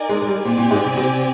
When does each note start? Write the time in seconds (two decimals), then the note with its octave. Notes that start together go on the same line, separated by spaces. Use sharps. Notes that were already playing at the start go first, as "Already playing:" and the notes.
Already playing: D#4 A#4 D5 G#5
0.09 G#3
0.22 G#3
0.27 G3
0.44 A#2 C4 G4 D5 G#5
0.58 A#2
0.71 G#2
0.85 C3
0.97 C3